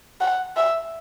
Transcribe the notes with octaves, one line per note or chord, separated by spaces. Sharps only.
F#5
E5